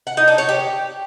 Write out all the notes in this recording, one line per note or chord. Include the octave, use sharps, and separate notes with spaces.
F#5
D#4
D4
C#5
G4